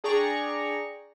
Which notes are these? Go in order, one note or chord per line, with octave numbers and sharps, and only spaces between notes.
D4 G#4 D5 G5 A#5 C#6